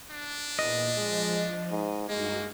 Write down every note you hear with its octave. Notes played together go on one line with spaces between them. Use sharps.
D4
E2 A#2 D#5
F3 G#3
G#2
G2 G#3 A#3 D#4 F#4